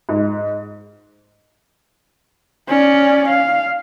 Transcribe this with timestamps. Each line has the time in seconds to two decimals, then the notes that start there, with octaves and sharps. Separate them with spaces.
0.09 G#2
2.68 C#4 D5
3.28 F5